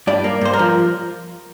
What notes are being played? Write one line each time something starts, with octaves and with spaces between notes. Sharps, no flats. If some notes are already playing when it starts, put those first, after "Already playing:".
G2 D5
A#3
G2 C5
A#4
F3